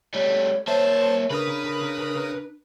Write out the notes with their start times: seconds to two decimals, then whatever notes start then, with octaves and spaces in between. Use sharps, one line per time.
0.14 G3 A3 C#5
0.67 A#3 C5 C#5 E5 A5
1.30 C#3 D4 A#4 B4 D#6